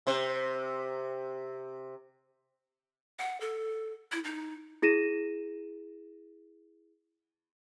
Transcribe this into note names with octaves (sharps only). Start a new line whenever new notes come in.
C3 C5
F#5
A4
E4
D#4
E4 G#4 A#6 D#7 E7